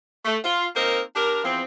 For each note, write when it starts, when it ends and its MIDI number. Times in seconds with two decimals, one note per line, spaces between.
0.25 0.38 57
0.45 0.65 65
0.76 1.01 58
0.76 1.01 60
0.76 1.01 63
0.76 1.01 70
1.16 1.41 62
1.16 1.41 67
1.16 1.41 70
1.44 1.63 40
1.44 1.63 53
1.44 1.63 60